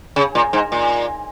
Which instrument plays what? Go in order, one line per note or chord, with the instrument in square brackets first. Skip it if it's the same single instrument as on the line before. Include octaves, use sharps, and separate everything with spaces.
[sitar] C#3
A#2
G#2
A#2